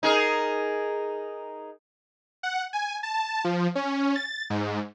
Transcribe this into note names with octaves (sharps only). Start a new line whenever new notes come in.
D#4 G#4 A#4
F#5
G#5
A5
F3
C#4
A6
G#2